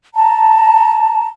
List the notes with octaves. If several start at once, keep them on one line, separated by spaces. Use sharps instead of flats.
A5 A#5